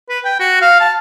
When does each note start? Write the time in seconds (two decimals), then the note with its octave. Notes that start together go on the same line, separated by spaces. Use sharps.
0.09 B4
0.25 G5
0.40 F#4
0.61 F5
0.80 A5